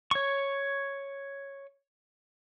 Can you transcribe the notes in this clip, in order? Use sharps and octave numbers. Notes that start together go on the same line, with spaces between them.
C#5 C#6